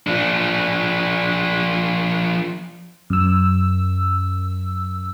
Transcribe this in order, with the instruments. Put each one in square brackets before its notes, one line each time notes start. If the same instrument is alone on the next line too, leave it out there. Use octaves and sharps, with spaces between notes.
[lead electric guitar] F3 D4
[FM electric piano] F#2 E6